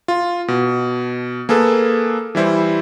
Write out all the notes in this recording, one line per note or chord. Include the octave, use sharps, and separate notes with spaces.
F4
B2
A#3 G#4 A4 B4
E3 G3 E4 C5